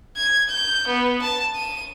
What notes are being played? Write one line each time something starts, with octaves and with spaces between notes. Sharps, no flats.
G#6
G6
B3
A5
D#7